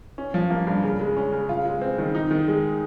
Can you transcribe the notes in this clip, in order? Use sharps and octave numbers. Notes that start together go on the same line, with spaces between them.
C#4
F3
A#3
G2
C#3
G#3
C#4
C#3
F4
G#3
C4
D#3
D#4
D#3
G#3